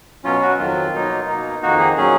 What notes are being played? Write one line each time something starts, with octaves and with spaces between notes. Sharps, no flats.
B2 F#3 C#4 F4
F#4
F2 D#3 F#3 F4
B2 F#3 A#3 D#4
B2 A#3 D#4
F2 D#3 A#3 D#4 F#4
G#4
A#2 F#3 C#4 G#4